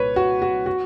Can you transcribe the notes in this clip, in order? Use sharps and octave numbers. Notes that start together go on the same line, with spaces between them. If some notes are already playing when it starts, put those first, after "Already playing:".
Already playing: C2 A#2 B4 C#5
F#4
F#4
F#4